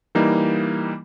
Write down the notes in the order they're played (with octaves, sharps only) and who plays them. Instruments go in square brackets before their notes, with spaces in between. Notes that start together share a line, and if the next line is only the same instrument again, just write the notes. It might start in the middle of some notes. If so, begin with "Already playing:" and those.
[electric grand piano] E3 G3 A#3 D#4